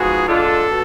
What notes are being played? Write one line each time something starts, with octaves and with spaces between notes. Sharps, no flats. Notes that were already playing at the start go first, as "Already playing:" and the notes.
Already playing: G#2 F3 B3 F#4 G#4
D3 G#3 D4 F4 A4
B2